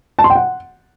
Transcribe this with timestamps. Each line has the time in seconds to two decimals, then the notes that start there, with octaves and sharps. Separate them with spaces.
0.19 A5
0.24 C6
0.30 G5
0.35 F#5